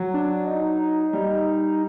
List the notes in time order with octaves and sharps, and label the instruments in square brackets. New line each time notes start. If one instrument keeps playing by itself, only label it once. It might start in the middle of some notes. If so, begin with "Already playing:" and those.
Already playing: [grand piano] F#3
[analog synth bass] D4
D#4
[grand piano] G3